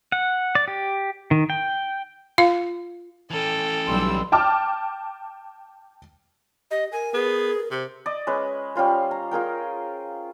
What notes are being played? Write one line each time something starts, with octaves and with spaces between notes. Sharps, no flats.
F#5
D5
G4
D#3
G5
F4 F5
E3 C#4 A4 G5
B1 G3 C6 E6
G5 A5 D6 F6
G4 D#5
A#4 G#5
B3 G#4
C3 C5
D5 D#5
G#3 C#4 B4
G3 C#4 F4 C5
A#5
F4 G#4 A#4 G5